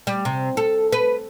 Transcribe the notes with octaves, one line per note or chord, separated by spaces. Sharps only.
G3
C3
A4
B4